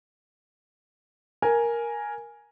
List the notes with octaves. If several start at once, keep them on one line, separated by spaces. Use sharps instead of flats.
A#4 G#5